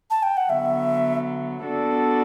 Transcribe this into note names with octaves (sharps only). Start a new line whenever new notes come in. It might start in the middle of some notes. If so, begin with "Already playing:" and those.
A5
G5
F#5
D3 F#3 B3 E5
B3 D4 F#4 A4 D5